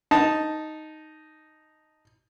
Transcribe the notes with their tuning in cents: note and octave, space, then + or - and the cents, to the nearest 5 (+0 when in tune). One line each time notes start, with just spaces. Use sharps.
D#4 +0 A5 +0